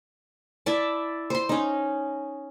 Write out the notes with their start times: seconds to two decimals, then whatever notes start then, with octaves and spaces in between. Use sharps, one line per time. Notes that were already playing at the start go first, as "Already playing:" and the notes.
0.66 E4 D5 E5 A5
1.30 C5 C6
1.49 C#4 D#4